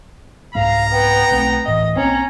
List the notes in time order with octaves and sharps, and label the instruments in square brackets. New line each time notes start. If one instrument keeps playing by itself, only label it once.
[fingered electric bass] C2 G#2 G#3 [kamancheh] F5 [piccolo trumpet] A#5
[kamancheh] B3 G5
[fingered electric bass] B1 A3 C4
[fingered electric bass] D1 A2 E3 [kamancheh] D#5
[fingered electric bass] B1 A#3 C4 [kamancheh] C#4 A#5